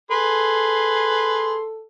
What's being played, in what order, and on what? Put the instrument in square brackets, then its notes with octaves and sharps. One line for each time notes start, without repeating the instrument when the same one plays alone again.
[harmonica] G#4 B4 C6 [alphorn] A4